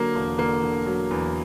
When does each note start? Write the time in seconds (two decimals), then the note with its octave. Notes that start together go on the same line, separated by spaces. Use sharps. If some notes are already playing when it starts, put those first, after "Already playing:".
Already playing: D3 F#3 A#3
0.15 E1
0.38 D3 A#3
0.63 D3
0.86 F#3
1.11 E2